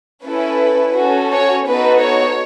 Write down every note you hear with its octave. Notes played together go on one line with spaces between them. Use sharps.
C#4 E4 A4 B4
C#4 F#4 A4
C#5
B3 D#4 F#4 A4 B4
C#5